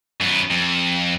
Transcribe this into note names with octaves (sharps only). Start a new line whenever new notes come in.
F#2 B3
F2